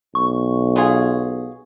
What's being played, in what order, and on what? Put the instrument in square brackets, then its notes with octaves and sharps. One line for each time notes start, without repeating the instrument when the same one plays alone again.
[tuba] B1 [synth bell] C#6
[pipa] B3 F4 G#4